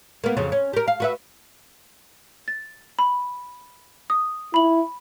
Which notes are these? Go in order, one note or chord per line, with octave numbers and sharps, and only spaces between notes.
A#3 B3
F2 C#3 F#3
C#4
G4 A#4
F5
F#4 B4 E5
A6
B5
D#6
E4 B5 F#7